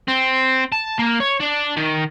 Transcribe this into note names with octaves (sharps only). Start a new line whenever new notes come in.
C4
A5
A#3
C#5
D4
D#3